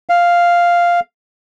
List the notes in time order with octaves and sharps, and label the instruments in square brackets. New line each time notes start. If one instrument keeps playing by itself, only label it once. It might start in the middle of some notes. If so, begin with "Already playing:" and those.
[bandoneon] F5